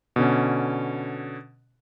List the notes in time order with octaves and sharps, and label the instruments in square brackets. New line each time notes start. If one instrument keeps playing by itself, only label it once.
[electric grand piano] B2 D3 C#4